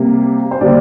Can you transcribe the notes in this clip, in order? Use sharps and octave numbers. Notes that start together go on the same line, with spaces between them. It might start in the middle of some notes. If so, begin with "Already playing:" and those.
Already playing: C3 G3 A#3
C5
D3 G3 A#3 D5